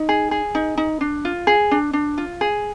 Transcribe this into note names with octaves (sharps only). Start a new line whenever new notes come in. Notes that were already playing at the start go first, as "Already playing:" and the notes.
Already playing: D#4
G#4
G#4
D#4
D#4
D4
F4
G#4
D4
D4
F4
G#4